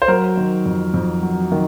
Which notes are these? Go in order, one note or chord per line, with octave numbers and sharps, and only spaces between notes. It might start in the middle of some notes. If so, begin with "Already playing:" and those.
C5
F#3 A#4
D#3
F2
F2
F#3
D#3